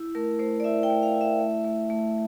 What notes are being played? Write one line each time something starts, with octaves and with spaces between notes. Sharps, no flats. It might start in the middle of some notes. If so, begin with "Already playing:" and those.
Already playing: E4
A3 A#4
A3 C5
D5
E4 E5
G5
A3
F5
E4
E5
A3
A3
A3